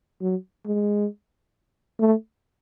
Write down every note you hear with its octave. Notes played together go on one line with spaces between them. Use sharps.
F#3
G#3
A3